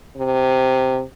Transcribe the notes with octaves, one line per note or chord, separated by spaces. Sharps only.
C3